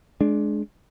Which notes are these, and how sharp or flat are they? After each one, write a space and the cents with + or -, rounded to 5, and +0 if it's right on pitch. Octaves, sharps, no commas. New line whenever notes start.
G#3 +25 D4 +0